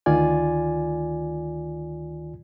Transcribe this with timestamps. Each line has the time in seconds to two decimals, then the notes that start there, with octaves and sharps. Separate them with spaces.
0.06 D2 D#3 F4 D5 G#5